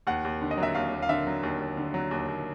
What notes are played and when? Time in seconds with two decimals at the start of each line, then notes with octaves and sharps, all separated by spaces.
0.07 D#2 F#5
0.25 D#2
0.41 D3
0.51 D#5
0.58 F#3
0.63 E5
0.75 D#2 F5
0.92 D#2
1.02 F5
1.09 D3 E5
1.27 F#3
1.43 D#2
1.60 D#2
1.77 D3
1.94 F#3
2.11 D#2
2.28 D#2